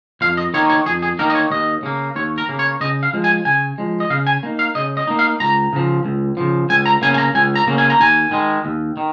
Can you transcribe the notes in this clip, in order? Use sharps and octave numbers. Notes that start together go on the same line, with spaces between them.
F2 F5
D#5
D#3 A#3 D#4 C#5
C#5
F2 G#4
G#4
D#3 A#3 D#4 A#4
D#5
C#5
D#2 D#5
C#3 A#3
D#2 C#5
A#4
C#3 A#3
C#5
C#3 D#5
F5
F3 G#3
G#5
C#3 G#5
F3 G#3
D#5
C#3 F5
G#5
A#3 D#4
F5
C#3 D#5
D#5
A#3 D#4
F5
C#2 A#5
C#3 F3
C#2
C#3 F3
C#2 G#5
A#5
C#3 A#3 C#4 G#5
G#5
A#5
C#2 G#5
A#5
C#3 A#3 C#4
G#5
A#5
D#2 G#5
D#3 G#3
D#2
D#3